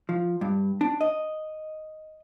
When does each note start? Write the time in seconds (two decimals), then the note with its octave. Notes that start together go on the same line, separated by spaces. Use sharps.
0.09 F3
0.41 G2
0.81 D4
1.01 D#5